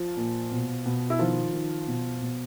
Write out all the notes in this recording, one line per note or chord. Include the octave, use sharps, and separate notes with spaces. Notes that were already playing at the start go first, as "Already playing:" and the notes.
Already playing: F3 F4
A#2
B2
B2
E4
D#3 F3 F4
D#3
B2
B2